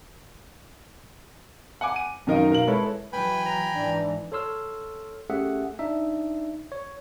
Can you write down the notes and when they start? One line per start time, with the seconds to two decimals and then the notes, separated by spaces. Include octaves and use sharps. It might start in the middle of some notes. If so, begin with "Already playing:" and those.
1.81 F#5 G#5 D6
1.96 D#7
2.27 F#2 D#3 D#4 A#4 D#5 F5
2.50 B2 A#4 F5 F#7
2.67 G#3 E4 A4 B4 C#5
3.13 E3 F#3 B4 G5 G#5 B5
3.46 A#5
3.75 G#2 E3 D4
4.32 A4 C#5 C6 E6 F6
5.30 A3 C#4 G4 G#4 E5 F#5
5.79 D4 D#4 E5
6.72 C#5